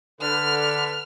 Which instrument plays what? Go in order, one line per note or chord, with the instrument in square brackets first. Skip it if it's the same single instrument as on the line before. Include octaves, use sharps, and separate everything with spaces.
[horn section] D3 B4 [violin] F6